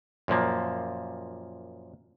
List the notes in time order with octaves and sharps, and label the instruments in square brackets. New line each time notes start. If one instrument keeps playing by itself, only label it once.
[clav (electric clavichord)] F#2 A#2 F3 A#3